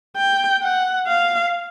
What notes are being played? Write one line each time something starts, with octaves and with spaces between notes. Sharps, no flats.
G5
F#5
F5